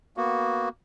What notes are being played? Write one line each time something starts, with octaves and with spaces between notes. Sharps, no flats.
A#3 B3 F#4